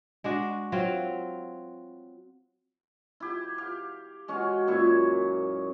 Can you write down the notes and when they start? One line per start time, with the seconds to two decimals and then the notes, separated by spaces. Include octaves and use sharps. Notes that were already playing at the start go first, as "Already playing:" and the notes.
0.24 G#3 D4 F#4
0.72 F#3 C4 F4
3.20 E4 G4
3.58 G4 F5
4.28 G#3 C#4 F#4 F5
4.67 F#2 A#2 E4 C#6